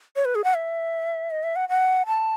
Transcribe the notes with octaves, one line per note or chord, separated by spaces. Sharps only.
C#5
B4
G#4
F#5
E5
D#5
E5
F#5
F#5
A5